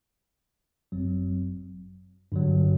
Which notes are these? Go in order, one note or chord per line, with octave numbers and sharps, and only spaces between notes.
G1 F#2 F#3 C4
G2 D3 F#3